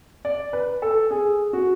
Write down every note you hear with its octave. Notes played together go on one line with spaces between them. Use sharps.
D5
B4
A4
G#4
F#4